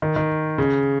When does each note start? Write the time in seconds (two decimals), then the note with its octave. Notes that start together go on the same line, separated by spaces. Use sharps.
0.02 D#3
0.16 D#3
0.58 C#3